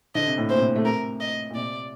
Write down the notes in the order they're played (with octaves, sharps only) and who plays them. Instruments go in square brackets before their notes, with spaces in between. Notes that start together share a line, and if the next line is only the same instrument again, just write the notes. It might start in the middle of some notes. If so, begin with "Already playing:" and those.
[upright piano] D3 [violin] D#5
[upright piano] C3
A2
[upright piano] A#2 [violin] C5
[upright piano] C3
A3
[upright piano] C3 [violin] A#4
[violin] D#5
[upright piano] A#2
[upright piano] C3 [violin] D5